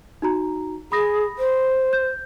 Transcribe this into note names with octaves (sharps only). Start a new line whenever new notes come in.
D#4 F#4 A#5
G#4 B5 D#6 A#6
C5
G6